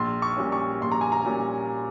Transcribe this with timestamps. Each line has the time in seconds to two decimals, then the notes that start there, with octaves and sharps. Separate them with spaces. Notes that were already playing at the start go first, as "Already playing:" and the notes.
Already playing: A#1 C6
0.22 C#6
0.37 A#2 G3 C#4
0.52 C#6
0.81 A#1 C6
0.91 A#5
1.01 G#5
1.12 A#5
1.25 A#2 G3 C#4